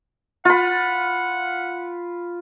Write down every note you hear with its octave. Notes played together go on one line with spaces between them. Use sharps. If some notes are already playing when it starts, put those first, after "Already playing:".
F4 F#5 B5